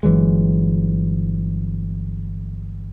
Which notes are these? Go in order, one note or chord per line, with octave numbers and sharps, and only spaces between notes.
G1 E3 F#3 G#3